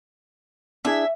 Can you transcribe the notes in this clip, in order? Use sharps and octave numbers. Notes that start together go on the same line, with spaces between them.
D4 E4 G#4 E5